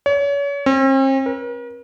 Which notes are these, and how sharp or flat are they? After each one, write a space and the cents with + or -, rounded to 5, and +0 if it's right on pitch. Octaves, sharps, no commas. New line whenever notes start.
C#5 +35
C4 +45
A#4 +45